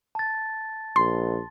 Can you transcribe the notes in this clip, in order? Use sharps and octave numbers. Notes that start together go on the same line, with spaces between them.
A5 A6
A#1 C6